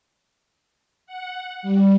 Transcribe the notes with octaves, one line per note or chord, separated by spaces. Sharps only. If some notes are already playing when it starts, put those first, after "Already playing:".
F#5
G3